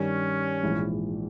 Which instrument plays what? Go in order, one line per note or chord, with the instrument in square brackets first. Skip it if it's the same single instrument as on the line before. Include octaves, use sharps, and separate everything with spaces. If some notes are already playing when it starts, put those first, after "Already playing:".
Already playing: [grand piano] G2 D#3 G3 [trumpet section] C#4
[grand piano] A#1 G#2 E3